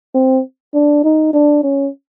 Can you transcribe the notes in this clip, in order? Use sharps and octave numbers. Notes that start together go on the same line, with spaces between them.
C4
D4
D#4
D4
C#4